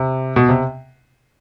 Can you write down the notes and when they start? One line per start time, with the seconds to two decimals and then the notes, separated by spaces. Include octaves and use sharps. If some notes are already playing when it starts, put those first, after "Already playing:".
Already playing: C3
0.36 B2
0.49 C3